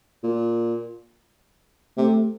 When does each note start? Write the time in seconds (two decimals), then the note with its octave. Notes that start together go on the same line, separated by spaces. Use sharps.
0.24 A#2
1.98 C3 A3